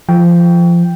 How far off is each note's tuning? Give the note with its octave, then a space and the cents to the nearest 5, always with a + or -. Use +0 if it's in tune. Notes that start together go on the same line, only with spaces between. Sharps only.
F3 -20 G5 +0